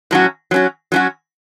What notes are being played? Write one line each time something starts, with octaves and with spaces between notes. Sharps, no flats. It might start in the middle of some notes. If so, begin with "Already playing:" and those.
A2 F#3 C#4 F#4
F#3 C#4 F#4
F#3 C#4 F#4